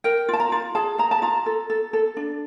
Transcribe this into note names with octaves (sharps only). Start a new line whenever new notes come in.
A#4 G5
F4 A5
A#5
F4
G#4 A5
G#4 A#5
A5
F4 A#5
A4
A4
A4
D4